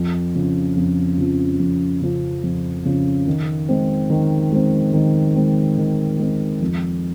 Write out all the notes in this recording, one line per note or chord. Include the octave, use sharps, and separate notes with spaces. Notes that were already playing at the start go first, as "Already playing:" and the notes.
Already playing: F2
C#3 F3
F2
C#3 F3
F2
C#3 F3
F2
C#3 F3
D#3
G#3 C4
D#3
G#3 C4
D#3
G#3 C4
D#3
G#3 C4
F2